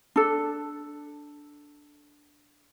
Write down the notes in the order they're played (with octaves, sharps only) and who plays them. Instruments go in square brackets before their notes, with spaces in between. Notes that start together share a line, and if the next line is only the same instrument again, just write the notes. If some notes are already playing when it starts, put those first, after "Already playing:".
[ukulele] D4 A4